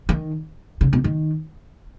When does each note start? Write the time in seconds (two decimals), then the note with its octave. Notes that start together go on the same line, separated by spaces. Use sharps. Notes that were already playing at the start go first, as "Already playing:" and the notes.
0.09 D#3
0.81 C#3
0.93 B2
1.04 D#3